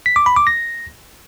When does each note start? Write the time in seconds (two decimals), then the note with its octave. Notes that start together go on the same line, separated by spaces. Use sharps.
0.06 B6
0.16 D6
0.26 B5
0.36 D6
0.47 A#6